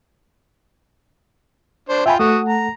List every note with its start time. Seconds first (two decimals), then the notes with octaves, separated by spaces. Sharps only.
1.89 D4 C5
2.06 F4 E5 G5 G#5 B5
2.20 A3 F#4 A4 F#5 D#6
2.48 A#5